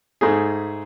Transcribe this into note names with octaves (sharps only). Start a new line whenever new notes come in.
G#2 A3 G#4